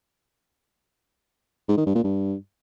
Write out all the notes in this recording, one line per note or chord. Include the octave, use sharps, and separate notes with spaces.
G#2
D#3
G2
A#2
G2